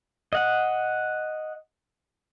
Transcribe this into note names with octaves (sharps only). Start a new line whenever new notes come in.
D#5 F#5